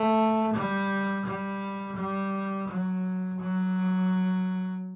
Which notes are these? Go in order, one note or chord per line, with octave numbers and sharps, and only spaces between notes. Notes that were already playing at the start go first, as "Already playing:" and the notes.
Already playing: A3
G3
G3
G3
F#3
F#3